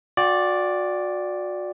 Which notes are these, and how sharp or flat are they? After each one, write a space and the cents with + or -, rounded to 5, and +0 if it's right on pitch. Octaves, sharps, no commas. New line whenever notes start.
F#4 -35 D5 +0 G5 +0